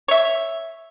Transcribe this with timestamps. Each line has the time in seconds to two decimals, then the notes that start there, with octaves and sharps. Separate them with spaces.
0.08 C#5 E5